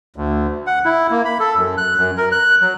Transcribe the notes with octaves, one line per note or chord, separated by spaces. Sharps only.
D2
F#5
E4
A#3
B5
A4
F#2
F#6
F#2
A#4
F#6
F#3